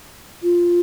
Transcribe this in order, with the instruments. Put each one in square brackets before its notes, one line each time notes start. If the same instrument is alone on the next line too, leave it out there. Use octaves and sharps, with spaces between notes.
[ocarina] F4